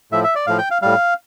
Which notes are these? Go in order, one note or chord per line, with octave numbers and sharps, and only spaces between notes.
A2 F3 E5
E5
D5
A2 F3 F5
G5
F5
A2 G3 F5